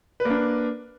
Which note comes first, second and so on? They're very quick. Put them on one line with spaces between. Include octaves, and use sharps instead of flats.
B4 A#3 D4